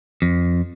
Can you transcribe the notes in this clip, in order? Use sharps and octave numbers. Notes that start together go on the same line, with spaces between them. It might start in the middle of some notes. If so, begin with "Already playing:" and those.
F2